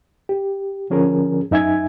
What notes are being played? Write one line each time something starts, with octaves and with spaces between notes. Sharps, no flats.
G4
D3 F3 C#4 G#4 A#4
F#2 D#4 E5 G#5 G#6